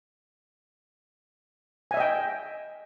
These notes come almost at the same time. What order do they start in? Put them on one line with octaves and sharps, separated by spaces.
G#5 E5 D#5 G5